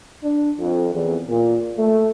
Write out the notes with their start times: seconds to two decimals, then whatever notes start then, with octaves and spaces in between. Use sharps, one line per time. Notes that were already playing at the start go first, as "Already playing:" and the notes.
0.23 D4
0.59 F2
0.93 E2
1.28 A#2
1.77 A3